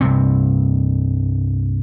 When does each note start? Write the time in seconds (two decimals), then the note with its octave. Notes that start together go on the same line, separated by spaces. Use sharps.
0.01 C2 G2 C3 C4